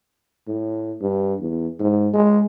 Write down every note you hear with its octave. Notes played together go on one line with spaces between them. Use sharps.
A2
G2
E2
G#2
G#3